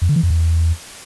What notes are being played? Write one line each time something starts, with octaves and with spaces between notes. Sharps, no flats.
F2
D3
E3
F2
E2